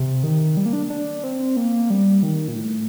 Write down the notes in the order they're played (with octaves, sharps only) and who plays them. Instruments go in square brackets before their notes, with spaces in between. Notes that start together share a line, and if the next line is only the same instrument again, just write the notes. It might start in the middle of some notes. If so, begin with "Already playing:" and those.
Already playing: [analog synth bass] C3
D#3
G3
A#3
D4
D4
C4
A#3
G3
D#3
A#2
A2